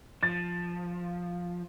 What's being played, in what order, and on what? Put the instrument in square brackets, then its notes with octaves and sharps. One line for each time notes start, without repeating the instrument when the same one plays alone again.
[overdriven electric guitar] F3 [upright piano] A6